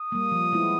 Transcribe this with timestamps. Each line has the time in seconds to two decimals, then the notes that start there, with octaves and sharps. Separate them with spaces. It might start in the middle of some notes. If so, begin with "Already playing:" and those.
Already playing: D#6
0.12 G3 A#3
0.32 F3
0.52 G#3 B3 E4